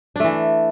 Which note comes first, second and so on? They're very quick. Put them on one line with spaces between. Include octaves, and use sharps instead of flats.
D4 A3 E3